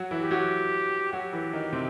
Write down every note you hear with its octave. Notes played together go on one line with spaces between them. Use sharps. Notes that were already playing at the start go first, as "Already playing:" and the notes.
Already playing: F#3 F#4
E3 E4
G4
F#3 F#4
F#3 F#4 G4
E3 E4
D#3 D#4
C3 C4